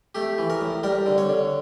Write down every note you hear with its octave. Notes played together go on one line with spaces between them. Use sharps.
A3 G4
E3
A#4
A2
G3 A#4
D3
C#5
D3